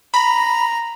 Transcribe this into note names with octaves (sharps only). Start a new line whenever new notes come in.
A#5 B5